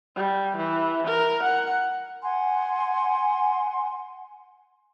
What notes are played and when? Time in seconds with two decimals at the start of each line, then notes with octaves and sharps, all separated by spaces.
0.16 G3
0.57 E3
1.07 A#4
1.43 F#5
2.23 F#5 G#5 C6